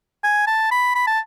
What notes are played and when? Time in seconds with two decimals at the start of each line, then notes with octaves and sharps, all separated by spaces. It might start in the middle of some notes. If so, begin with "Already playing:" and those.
0.23 G#5
0.47 A5
0.71 B5
0.95 B5
1.07 A5